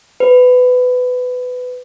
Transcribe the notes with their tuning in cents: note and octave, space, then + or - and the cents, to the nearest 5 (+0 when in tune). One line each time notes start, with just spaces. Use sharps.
B4 +20